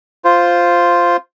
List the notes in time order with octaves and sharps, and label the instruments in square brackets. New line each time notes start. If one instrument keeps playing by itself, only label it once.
[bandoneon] F4 C5